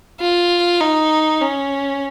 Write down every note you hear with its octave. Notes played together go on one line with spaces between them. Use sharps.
F4
D#4
C#4